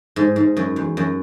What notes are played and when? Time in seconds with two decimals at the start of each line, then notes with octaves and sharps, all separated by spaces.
0.16 G#2
0.36 G#2
0.57 F#2
0.76 E2
0.97 F#2